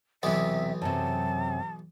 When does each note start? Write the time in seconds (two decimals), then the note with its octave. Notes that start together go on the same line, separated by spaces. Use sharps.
0.23 B1 E2 C3 E3 B3 E5
0.82 F#2 C3 A5